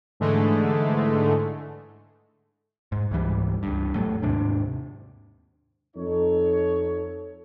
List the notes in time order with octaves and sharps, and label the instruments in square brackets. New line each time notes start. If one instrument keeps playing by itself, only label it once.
[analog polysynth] G#2 D3 E3 G#3 A3
[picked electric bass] G#2
C#2 G#2 E3 G3
C#2 G2
E2 A2 F#3 A3
D#2 G#2 C3 D4
[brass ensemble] F2 D#4 A4 C#5